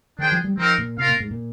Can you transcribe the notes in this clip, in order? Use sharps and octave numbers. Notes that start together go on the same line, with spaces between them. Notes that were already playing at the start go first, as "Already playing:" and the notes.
D#3 D4 G#4 C5 G5
F3
G3
F3 C4 D#4 A#4 F5
A#2
C3 F4 A#4 F5
A#2
G#2
A#2